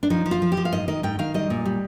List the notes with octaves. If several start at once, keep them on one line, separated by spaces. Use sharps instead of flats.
D4
F3 D#4
F3
F4
F3
G4
F3
F5
G#2 D#5
D#3 D#5
G#2 G5
D#3 F5
G3 D#5
A#2
G3